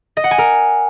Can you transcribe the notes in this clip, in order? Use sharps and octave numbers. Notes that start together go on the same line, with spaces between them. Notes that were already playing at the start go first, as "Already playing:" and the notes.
D#5
F#5
G#5
A#4